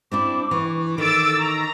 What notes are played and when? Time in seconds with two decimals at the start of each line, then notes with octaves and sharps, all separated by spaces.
0.12 C4 D4 E4 D6
0.51 E3 C#6
0.98 D#3 A4 D6 E6 A6
1.39 A#5 C#6